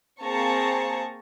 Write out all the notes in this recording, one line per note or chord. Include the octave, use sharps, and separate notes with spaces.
A#3 C4 G#4 A5 A#5 C#6